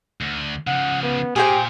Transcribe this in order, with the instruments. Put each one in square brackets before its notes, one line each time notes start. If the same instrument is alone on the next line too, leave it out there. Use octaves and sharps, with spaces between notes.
[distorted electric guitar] D2
[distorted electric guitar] C#3 F3 [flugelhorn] F#5
[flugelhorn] B3
[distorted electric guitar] A#2 [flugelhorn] G4 [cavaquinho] G#4 C5 G5